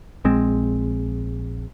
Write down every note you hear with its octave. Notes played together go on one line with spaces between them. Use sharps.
A#1 G#3 C4